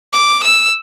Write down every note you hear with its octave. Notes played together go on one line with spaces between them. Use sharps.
D6
E6